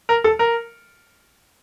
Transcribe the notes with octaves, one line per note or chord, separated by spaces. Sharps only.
A#4
A4
A#4